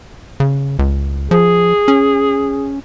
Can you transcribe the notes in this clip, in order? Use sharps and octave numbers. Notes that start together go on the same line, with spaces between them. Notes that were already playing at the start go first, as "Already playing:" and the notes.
C#3
C#2
F3 G#4
C#4